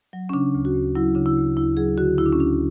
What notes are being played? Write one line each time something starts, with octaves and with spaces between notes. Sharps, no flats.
F#3
C#4
C#3 D4
D2
F#4
D2
F#3 E4
C#3 D4
E4
D2
D2 E4
F#3 G#4
D3 F#4
D2 E4
D4
C#4
D2 D4